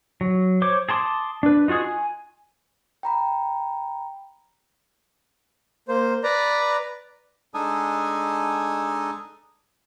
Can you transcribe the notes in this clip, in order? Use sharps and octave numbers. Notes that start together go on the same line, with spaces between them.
F#3
C5 C#5 D6
G#4 A5 C6 D6 D#6
D4 B4
D#4 F4 F#4 G#4 D#6
G#5
G5 A#5 B5
A#3 C5
B4 D5 A#5
G#3 D4 D#4 A4 D#5 G#5